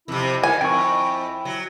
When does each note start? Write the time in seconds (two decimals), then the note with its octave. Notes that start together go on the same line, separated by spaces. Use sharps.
0.08 F2 C3 E4
0.43 D#3 G#5
0.61 F2 E4 G5 C#6
1.45 F#3